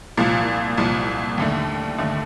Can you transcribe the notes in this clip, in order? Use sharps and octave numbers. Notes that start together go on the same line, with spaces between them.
C2 A#2 F3
C2 A#2 F3
D#2 D3 A3
D#2 D3 A3